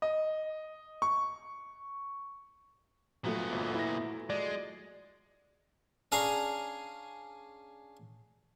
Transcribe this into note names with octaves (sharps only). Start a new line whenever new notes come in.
D#5
C#6
A#2 F3 F#3 A3 B3
G1
E4 A#6
G#3 D5
C#4 D4 G#4 F5 G#5 A#5